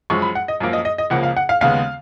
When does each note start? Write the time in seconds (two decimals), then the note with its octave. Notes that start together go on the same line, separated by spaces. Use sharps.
0.10 F#2 F3 G#3 C#6
0.22 B5
0.35 F#5
0.48 D#5
0.60 F#2 F3 A#3
0.73 D#5
0.85 D#5
0.98 D#5
1.10 C#2 C#3 F3 A#3 F#5
1.23 F5
1.37 F#5
1.49 F5
1.61 D#2 C#3 G#3 B3 F5